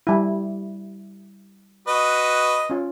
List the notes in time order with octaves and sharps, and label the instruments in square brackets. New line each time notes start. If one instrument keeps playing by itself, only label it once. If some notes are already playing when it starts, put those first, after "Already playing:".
[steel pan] G3 E4
[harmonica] F#4 B4 D#5
[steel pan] C#4 F4